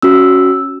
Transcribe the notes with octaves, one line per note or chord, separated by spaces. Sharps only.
C#4 F#4 E6